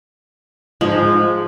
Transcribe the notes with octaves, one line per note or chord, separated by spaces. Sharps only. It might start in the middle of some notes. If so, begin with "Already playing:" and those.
G#2 F3 G#3